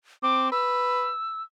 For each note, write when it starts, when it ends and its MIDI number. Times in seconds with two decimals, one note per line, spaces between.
0.23 0.50 60
0.23 0.49 86
0.52 1.11 71
0.52 1.43 88